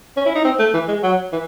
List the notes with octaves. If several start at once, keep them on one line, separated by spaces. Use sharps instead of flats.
C#4
E4
D#4
C4
A3
E3
G#3
F#3
E3